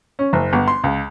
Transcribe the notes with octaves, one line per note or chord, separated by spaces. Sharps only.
C#4
F#1
G1
C6
C#2